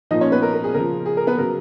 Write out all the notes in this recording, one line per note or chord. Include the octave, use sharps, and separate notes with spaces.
A#2 F3 D#4 D#5
C#4 C#5
B3 B4
A#4
A#4
G#4
C#3 F3 A#4
G#4
A#4
B3 B4
C#3 F#3 A#4